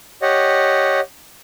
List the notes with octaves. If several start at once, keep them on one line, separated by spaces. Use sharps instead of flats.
G4 C#5 D#5 F#5